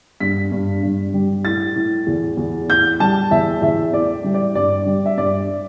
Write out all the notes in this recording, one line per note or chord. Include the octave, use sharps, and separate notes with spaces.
G2 B6
G2
G2
G3
A2 A6
A2
E2
E2
A2 G6
G3 A5
E2 E5
E2 E5
A2 D5
G3
D5
G2 D5
G3
E5
G2 D5